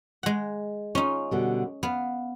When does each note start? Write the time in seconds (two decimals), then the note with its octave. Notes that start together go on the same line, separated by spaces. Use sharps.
0.23 G#3 F#5
0.95 C#4 D#4 F4
1.31 B2 D3 G3
1.83 B3 F5